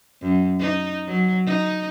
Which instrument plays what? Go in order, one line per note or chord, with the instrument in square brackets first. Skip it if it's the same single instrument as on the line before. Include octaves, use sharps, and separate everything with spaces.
[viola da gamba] F#2
D#4
F#3
D#4